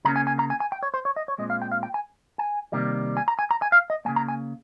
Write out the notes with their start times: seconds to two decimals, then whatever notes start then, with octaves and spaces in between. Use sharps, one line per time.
0.05 C#3 F3 A#3 C#4 A#5
0.16 G#5
0.27 G#5
0.39 A#5
0.50 G#5
0.60 G#5
0.72 G5
0.83 C#5
0.94 C5
1.05 C#5
1.16 D#5
1.28 C#5
1.38 A#2 G#3 C4 D#5
1.50 F5
1.62 G5
1.72 F5
1.83 G5
1.94 G#5
2.38 G#5
2.72 C3 D#3 G3 A#3
3.17 G#5
3.28 A#5
3.39 G#5
3.51 A#5
3.62 G#5
3.72 F5
3.90 D#5
4.05 C#3 F3 A#3 G#5
4.16 A#5
4.29 G#5